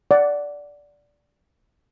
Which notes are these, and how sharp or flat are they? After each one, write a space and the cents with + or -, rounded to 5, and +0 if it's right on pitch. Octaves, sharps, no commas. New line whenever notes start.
D5 -10 F#5 +0